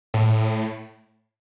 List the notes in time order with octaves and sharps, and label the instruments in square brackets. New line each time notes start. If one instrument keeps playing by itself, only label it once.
[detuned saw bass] A2